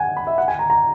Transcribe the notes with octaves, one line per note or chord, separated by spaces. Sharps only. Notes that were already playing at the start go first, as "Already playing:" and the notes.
Already playing: F#5 G#5
B5
E5
F#5
G#5
A#5
A#5